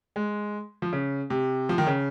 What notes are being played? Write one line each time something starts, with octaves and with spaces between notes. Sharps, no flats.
G#3
F3
C#3
C3
F3
D#3
C#3